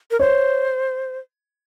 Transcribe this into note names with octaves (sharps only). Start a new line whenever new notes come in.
A#4
C5 C#5